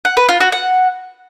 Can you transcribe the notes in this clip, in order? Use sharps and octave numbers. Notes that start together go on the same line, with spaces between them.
F#5
B4
F4
F#4
F#5